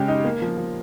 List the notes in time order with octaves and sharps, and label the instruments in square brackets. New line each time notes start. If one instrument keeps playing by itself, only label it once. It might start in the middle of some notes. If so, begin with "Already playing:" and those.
Already playing: [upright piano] C#3 G#3 G4
D#4
A#3
F3
F3